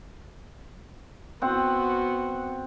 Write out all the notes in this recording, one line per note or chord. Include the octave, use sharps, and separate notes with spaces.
B3 C4 F#4 F#5